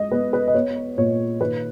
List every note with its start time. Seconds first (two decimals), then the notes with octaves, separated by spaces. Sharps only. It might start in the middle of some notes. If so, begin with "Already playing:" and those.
Already playing: G#3 D#5
0.11 B3 B4
0.33 B4
0.47 D#5
0.54 B3 C#5
0.97 A#2 C#5
1.41 D#3 B4